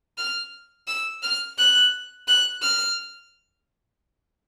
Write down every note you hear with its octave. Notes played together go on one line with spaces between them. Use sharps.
F6
E6
F6
F#6
F#6
F6